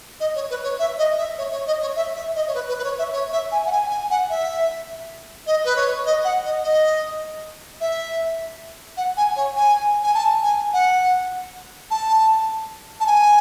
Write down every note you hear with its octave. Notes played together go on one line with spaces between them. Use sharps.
D#5
C#5
B4
C#5
E5
D#5
E5
C#5
C#5
D#5
C#5
E5
E5
D#5
C#5
B4
B4
B4
C#5
E5
C#5
E5
G#5
F#5
G#5
G#5
F#5
E5
D#5
B4
C#5
D#5
F#5
D#5
D#5
E5
F#5
G#5
C#5
G#5
G#5
A5
G#5
F#5
A5
A5
G#5